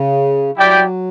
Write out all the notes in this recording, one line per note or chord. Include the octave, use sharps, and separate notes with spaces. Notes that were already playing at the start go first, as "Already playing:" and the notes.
Already playing: C#3
F#3 E4 G4 D5 G5